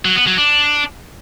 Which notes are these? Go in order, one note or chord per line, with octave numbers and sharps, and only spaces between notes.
F#3
B3
F#3
D4